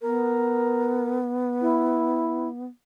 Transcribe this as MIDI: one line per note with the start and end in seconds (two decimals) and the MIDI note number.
0.02 2.65 59
0.02 1.19 70
1.62 2.49 64